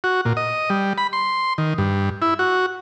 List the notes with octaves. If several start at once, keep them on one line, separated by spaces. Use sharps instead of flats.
F#4
A#2
D#5
G3
B5
C6
D#3
G2
E4
F#4